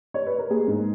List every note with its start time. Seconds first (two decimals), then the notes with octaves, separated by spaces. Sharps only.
0.14 C#5
0.27 B4
0.38 A#4
0.50 A#3 G#4
0.68 G#2